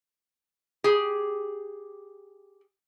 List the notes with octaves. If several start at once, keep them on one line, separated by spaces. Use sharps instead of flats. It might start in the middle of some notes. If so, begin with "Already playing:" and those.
G4 G#4